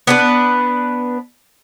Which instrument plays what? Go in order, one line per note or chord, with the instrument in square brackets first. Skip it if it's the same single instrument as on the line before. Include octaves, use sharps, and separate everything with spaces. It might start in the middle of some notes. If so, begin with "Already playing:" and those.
[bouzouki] B3 D4 B4